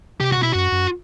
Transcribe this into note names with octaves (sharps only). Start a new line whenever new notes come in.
C3 G4
B2 F#4
E4
F#2 F#4
F#2